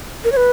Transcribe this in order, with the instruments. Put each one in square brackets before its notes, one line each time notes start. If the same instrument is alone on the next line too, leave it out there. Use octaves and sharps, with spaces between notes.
[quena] A#4
C#5
B4